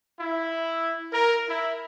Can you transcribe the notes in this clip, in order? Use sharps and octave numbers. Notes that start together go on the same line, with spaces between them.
E4
A#4
E4